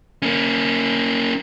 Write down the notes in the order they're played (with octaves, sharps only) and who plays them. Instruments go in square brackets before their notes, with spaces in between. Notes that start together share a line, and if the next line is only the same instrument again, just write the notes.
[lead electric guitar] A#3 C#4